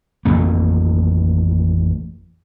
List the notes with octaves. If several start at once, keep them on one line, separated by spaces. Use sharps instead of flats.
A1 F2 A#3